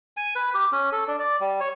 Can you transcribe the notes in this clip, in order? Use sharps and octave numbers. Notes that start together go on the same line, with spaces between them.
G#5
B4
G4
C#4
A4
D4
D5
G3
C#5